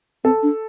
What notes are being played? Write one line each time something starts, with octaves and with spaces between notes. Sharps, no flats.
C4 A4
D4